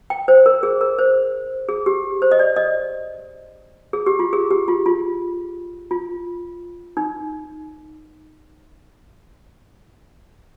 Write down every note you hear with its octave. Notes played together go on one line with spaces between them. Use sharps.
G5
C5
A#4
G#4
A#4
C5
G#4
G4
C5
D#5
D5
D#5
G#4
G4
F4
G#4
G4
F4
F4
F4
D#4